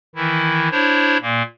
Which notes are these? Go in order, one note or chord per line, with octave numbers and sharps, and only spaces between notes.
D#3 E3 E4
D4 E4 C5 C#5
A#2 A#3